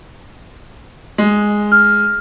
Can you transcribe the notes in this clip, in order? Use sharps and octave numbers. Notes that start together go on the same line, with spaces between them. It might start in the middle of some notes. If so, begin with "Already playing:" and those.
G#3
F6